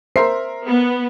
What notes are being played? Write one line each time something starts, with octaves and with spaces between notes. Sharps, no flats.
A#4 C5 E5 C7
B3